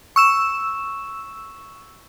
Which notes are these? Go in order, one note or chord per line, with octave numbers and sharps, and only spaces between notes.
C#6 E6 E7